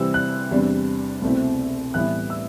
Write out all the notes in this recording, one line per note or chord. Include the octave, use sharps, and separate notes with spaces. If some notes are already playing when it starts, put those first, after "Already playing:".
Already playing: C3 E3 G3 C4 E6
F#6
E2 C3 G3 D4
C2 B2 A3 C4 E4
A2 E3 G3 B3 E4 F#6
E6